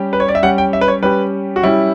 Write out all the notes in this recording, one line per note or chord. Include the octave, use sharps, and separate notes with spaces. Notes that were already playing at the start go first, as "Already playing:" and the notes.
Already playing: G3 C#4 G4
B4
C#5
D5
E5
G3 C#4 G4 F#5
G5
E5
B4
C#5
G3 C#4 G4 B4
F#4
G3 C#4 E4 G4